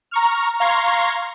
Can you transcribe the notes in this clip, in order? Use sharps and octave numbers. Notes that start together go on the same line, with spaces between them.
A#5 C#6 F6
F5 A#5 C6 C#6 G#6 C7